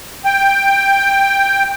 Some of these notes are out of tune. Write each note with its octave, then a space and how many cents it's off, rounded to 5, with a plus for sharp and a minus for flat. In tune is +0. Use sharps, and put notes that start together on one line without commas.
G5 +10